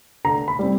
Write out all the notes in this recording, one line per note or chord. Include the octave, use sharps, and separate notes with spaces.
D3 A#5
B5
G3 C4